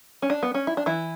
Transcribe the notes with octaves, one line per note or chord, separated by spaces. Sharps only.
C#4
D4
B3
C#4
E4
D4
E3 E4